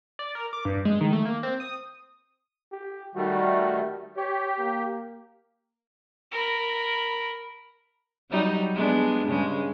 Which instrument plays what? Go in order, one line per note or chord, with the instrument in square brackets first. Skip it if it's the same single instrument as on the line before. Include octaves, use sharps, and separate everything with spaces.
[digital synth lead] D5
A#4
D6
G2
G#3
D#3
A3
A#3
C4
D#6
[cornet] G4
[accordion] D#3 G3 A3 [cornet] F#4
[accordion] G4 [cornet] C#5
[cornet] A#3
[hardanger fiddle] A#4 B5
[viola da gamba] F#3 G3 D#4
G#3 B3 D4
G2 C#3 G#3